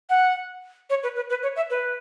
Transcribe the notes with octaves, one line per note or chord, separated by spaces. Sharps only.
F#5
C#5
B4
B4
B4
C#5
E5
B4